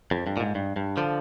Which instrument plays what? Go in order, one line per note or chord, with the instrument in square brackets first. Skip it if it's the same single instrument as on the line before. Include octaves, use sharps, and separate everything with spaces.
[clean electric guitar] F2
G2
A#2
G#2
G2
G2
D3 F3